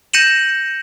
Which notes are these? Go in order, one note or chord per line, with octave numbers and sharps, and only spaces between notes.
G6 A#6 C#7 D#7 E7 F#7